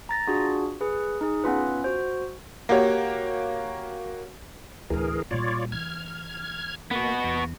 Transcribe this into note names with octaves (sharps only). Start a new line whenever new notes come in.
A#5 A6 A#6
D4 F4 F#4 G#4
G#4 B4
D#4 G#4
B3 C#4 F4 B4
F#4 C5
A#3 F#4 G4 C#5
D2 A2 E3 G#4 A#4
A#2 G3 F4 C#5 D5
E3 F6 G#6
A#3 B3 F#4
E2